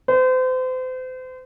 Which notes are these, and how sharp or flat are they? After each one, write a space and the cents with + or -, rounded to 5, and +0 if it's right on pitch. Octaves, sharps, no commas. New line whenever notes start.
C5 -35